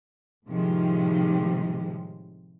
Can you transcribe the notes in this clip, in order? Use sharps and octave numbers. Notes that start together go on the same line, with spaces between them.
A2 C3 D#3 F3 G3 G#3